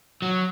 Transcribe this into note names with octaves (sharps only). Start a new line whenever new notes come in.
F#3